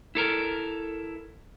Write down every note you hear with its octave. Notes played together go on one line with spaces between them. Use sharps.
E4 A4 A#4